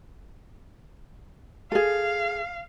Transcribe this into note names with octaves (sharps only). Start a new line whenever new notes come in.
G#4 A4 F5